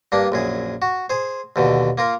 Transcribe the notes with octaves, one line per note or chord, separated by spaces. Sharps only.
G2 A#3 D4
A#1 F#2 G#4
F#4
G#4 C5
D#2 B2 D3
A#3 F4 A#4